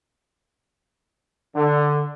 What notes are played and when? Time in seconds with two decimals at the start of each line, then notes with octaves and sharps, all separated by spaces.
1.56 D3